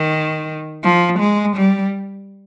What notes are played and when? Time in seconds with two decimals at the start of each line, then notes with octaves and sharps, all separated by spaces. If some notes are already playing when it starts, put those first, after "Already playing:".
Already playing: D#3
0.84 F3
1.20 G#3
1.57 G3